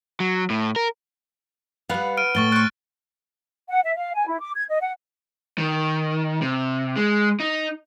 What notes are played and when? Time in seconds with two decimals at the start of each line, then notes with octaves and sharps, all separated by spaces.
0.20 F#3
0.50 A2
0.76 A#4
1.89 G3 B3 B4 F5 F#5
2.17 F6 D7 D#7
2.35 A2 A3 C#6 A6 G7
2.52 C5 C#6 F#6 A6 D7
3.69 F#5
3.84 E5
3.96 F5
4.14 G#5
4.27 E4
4.40 D6
4.56 G#6
4.68 D#5
4.81 F#5
5.58 D#3
6.42 C3
6.96 G#3
7.40 D#4